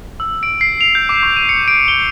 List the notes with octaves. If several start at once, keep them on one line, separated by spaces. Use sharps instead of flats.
E6
D7
C7
F7
G6
D6
C#6
D#7
C#7
D7
G7